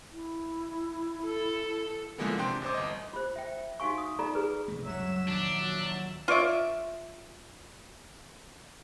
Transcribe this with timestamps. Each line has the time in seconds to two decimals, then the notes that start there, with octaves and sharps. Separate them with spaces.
0.12 E4
1.26 A4
2.18 D3 E3 F3 G#3 A#3 B3
2.38 C3 D4 G5 C6
2.62 A1 C5 D6
2.74 G1 D#5
3.13 F4 C5
3.36 E5 G5
3.80 D#4 F#4 F5 G#5 C#6
3.98 D#6
4.19 D#4 F4 A4 D5 A#5
4.35 G#4 B4
4.68 C3 F3 A3
4.85 C#2 F#2 F#3 G3 E5 E7
5.28 D#2 A#2 F3 D4
6.28 F4 C#5 D5 E5